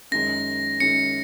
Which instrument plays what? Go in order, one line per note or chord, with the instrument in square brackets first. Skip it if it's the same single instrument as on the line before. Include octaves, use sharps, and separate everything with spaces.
[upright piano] F#2 D#3 G#3 C#4 [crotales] A#6
[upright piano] F#2 D#3 G#3 C#4 [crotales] C#7